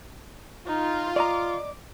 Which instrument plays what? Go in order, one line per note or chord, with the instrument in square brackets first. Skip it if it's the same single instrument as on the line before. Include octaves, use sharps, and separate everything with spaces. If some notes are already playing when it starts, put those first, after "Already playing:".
[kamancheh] D#4 [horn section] F4
[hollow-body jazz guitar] D5 D#5 A#5 [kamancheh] D6